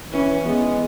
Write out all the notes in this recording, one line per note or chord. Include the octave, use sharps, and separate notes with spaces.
E3 C#4
G#3 B3